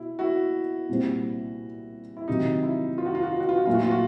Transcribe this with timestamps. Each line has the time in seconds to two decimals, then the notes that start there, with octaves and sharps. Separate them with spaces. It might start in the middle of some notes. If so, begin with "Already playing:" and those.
Already playing: B2 E4
0.19 E4 F#4
0.89 C2 A#2 G3 C4
2.17 E4
2.28 C3 D#3 F#3 D#4
2.63 E4
2.98 F4
3.06 F#4
3.15 F4
3.23 F#4
3.32 F4
3.40 F#4
3.49 F4
3.57 F#4
3.66 A#1 A#2 F#3 A3 F4
3.74 F#4
3.83 F4
3.91 F#4